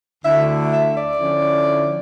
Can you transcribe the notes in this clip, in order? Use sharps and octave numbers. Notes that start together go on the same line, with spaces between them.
D2 D3 A3 E4 E5
E5
D5
D3 F3 C#4 E4